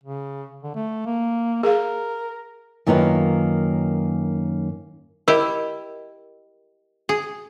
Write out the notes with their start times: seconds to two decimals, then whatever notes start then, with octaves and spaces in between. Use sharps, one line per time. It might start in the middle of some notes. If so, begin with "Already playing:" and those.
0.03 C#3
0.63 D3
0.75 A3
1.06 A#3
1.63 G#4 A#4 F5
2.86 F#2 D#3 A#3 F4 B4 C#5
5.28 E4 G4 A#4 D#5
7.09 G#4